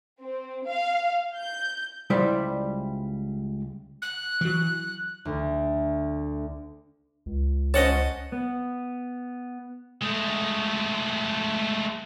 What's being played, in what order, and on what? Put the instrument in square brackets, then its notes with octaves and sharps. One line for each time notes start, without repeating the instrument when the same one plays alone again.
[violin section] C4
F5
G6
[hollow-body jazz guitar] C#2 G3 E4 C5 D5
[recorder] F#6
[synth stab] E3 F#3
[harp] D2
[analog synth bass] C#2
[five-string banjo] C#4 C5 C#5 [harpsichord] D#5 F#5 A5
[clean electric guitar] B3
[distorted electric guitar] G#3 A3